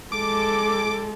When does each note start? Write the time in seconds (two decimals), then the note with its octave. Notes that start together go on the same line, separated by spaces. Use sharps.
0.12 G#3 A4 D6